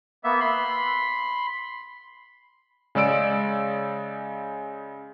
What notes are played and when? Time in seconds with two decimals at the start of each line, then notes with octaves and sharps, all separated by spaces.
0.24 A#3 B3 E5
0.40 B5 C6
2.95 C#3 G#3 D5 E6 D7